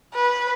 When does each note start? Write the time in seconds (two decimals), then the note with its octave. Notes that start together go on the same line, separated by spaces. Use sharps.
0.14 B4